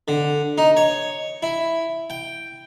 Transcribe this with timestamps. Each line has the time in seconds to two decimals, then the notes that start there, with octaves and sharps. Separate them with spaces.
0.08 D3
0.58 D#4
0.77 C#5
1.42 E4
2.10 G5